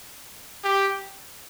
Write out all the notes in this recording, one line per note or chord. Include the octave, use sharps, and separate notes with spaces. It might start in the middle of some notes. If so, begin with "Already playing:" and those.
G4